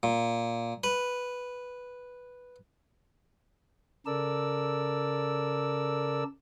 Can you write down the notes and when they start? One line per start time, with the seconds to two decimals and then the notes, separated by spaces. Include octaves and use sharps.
0.03 A#2
0.84 B4
4.06 C#3 A4 A#4 D5 E6